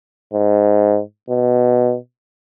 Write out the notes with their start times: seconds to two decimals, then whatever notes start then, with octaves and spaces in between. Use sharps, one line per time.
0.33 G#2
1.29 B2